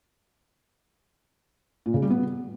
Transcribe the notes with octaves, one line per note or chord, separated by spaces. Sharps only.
A#2
C#3
G3
B3